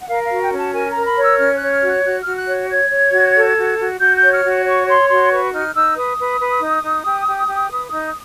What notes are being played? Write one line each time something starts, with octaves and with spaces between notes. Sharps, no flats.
F#5
A#4 F5
F5
F#4
G5
C#4
A5
A#4 G#5
A#5
A#4
B5
C#5
E6
C#4 F6
F#6
C#5
F6
F#4
F#6
F#4 F#6
F#4 F6
F#6
C#5
C#5 G#6
C#5
F#4
A4
F#4
F#4
F#4 G6
G6
C#5
F6
F#4
C#5 C#6
C#5 C6
F#4 C6
B4 C#6
D#4 F6
D#4 E6
B4 D#6
B4
B4
D#4
D#4
G4
G4
G4
B4
D#4